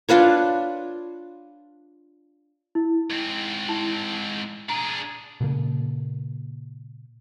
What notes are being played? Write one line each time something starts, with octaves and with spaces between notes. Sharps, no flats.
D4 F4 B4 C#5
E4
G#2 C4
E4 A5
D4 G#4 A#5
A#2 C#3 A#3